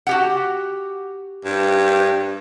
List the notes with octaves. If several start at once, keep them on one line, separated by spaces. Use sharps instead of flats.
F#4 G4 F#5
G2